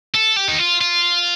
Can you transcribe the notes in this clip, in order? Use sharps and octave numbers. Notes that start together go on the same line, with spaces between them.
A4
G4
D#4
F4
F4